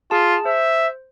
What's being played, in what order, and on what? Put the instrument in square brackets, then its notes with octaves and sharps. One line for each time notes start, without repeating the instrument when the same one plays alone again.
[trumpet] F4 [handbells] G#4 A5
[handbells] C5 [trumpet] E5